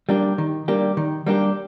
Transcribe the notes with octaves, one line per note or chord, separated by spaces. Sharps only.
G3 A#3 D4 G4
D#3
G3 A#3 D4 G4
D#3
G3 A#3 D4 G4